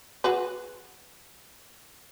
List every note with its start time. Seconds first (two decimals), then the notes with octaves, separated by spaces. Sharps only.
0.24 F#4 G#4 B4